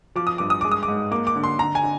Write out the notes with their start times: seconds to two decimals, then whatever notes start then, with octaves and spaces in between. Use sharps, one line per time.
0.16 F3 D6
0.27 D#6
0.38 G2 D6
0.50 D#6
0.61 G#3 D6
0.72 D#6
0.83 D6
0.88 G#2
1.11 A#3 D6
1.27 D6
1.36 D3
1.44 C6
1.59 D3 A#5
1.75 G#5
1.83 D3